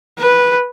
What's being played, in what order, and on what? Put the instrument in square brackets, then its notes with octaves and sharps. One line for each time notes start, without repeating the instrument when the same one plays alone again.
[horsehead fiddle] B4